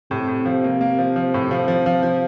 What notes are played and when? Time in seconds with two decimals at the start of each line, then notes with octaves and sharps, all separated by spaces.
0.11 A2 C3
0.28 A2
0.45 F3
0.64 A#3
0.81 A#3
0.98 F3
1.16 F3
1.34 A2
1.51 C3 F3
1.68 F3
1.86 F3
2.03 F3